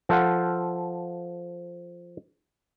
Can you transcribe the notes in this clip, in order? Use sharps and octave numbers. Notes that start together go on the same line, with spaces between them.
F3 A4 C5 F5 F#5